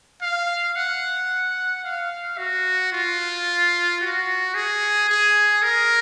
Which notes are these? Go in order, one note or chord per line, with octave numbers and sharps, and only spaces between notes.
F5
F#5
F5
F#4
F4
F#4
G#4
G#4
A#4